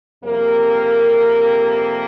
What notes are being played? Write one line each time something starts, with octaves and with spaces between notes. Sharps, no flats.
F2 C3 G3 A#3 A#4